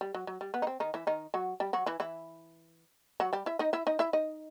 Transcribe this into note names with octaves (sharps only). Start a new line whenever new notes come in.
G3
F#3
F#3
G3
B3
D#4
C4
D#3 D#4
E3 E4
D#3 D#4
F#3 F#4
G3 G4
F#3 F#4
E3 E4
E3 E4
F#3 F#4
G3 G4
E4 E5
D#4 D#5
E4 E5
D#4 D#5
E4 E5
D#4 D#5